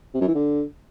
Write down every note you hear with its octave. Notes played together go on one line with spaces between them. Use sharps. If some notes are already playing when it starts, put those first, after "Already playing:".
C3
F#2
E3
D3